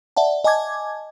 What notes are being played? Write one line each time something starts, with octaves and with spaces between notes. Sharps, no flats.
D5 E5 F#5 A5
D#5 G#5 A5 D6 G#6